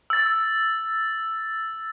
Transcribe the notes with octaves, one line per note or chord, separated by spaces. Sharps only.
E6 A6